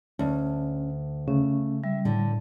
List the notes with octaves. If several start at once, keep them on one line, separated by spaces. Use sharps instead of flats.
D2 C#4
C#3 A3 C#4
G3 E5
A2 D3